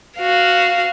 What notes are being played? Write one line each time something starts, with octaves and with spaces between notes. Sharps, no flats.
F#4 F5